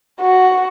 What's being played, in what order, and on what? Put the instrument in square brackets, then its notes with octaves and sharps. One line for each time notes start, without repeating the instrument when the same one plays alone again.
[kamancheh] F#4